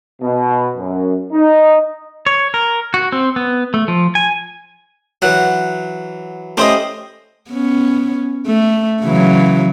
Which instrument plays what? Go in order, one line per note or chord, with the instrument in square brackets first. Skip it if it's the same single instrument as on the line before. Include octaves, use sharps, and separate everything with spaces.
[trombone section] B2
F#2
D#4
[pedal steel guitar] C#5
A#4
F#4
C4
B3
A3
F3
G#5
[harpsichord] E3 F#3 [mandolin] F#5
[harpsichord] A3 C#4 E4 [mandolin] G4 C5 D#5
[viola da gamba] B3 C#4
A3
C#3 E3 F#3